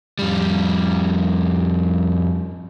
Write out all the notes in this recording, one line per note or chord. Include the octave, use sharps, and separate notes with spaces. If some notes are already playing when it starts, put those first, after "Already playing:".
F2 G3